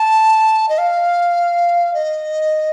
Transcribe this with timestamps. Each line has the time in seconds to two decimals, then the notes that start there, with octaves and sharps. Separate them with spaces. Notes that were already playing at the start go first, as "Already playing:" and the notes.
Already playing: A5
0.69 D#5
0.78 F5
1.94 D#5